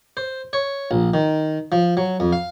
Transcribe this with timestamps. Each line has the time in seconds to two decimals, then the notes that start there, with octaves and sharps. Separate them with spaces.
0.17 C5
0.53 C#5
0.91 A#1
1.14 D#3
1.72 F3
1.97 F#3
2.20 F2
2.33 F5